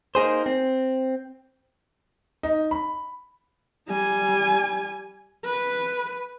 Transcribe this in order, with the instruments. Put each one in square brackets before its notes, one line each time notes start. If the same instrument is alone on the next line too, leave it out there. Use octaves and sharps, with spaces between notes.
[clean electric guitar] A#3 D#4 G#4 C5
C4
[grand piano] D#4
B5
[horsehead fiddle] G3 G#5
B4